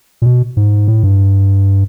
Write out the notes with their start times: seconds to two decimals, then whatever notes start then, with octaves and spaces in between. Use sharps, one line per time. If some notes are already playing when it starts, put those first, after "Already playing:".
0.22 A#2
0.26 B2
0.57 G#2
0.88 A2
1.03 G2